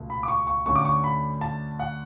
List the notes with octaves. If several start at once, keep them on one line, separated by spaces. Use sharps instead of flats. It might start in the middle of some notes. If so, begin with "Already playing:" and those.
Already playing: C#2 B2 A3
B5
D6
C#6
C#6
D2 D3 A3 C#4 C#6
D6
C#6
B5
A5
F#5